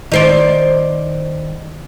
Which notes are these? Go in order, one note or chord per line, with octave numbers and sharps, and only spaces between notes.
D#3 C5 D5